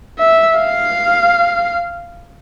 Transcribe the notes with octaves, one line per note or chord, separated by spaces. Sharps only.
E5
F5